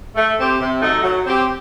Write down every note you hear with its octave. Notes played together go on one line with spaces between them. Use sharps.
A3
C4 G4
C3
F#3 A3 D#4
F#3
C4 G4